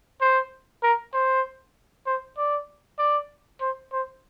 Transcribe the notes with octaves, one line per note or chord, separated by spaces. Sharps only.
C5
A#4
C5
C5
D5
D5
C5
C5